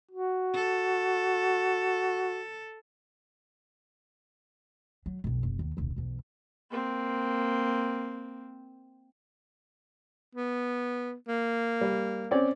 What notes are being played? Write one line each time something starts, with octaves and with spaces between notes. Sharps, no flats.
F#4
A4
F#3
B1 F2
F#1
D#2
D#1 C2
B1 E2
A#3 C4
B3
A#3
G3
C4 C#4 D5